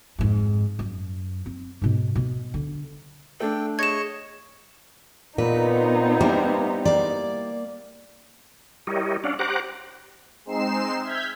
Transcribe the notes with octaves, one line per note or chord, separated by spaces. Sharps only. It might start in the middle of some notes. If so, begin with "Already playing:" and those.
F2 G#2
F#2
C4
G#2 B2
B2
D3
A3 D4 A4 G5
G#4 C#5 D#5 C#6 G#6 E7
A#2 B3 C4 D#4 B4
G3 A#3 E4 G4
A#3 D5
G3 E4 G4 A#4 C#5 D#5
C#4 D4 D5 F5 F#5
G4 C5 F#5 A#5 D6 F#6
G#3 C4 D#4 C7 E7
E5 F6 G6 G#6 B6